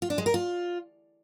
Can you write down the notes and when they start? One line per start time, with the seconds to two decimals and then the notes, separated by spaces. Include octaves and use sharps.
0.02 F4
0.10 D4
0.18 G#3
0.26 A#4
0.34 F4